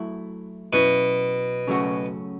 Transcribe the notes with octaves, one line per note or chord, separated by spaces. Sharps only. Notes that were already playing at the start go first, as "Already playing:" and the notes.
Already playing: F#3 A3 E4
B2 F#3 C#4 E4
C#3 F#3 A3 C#4 F#4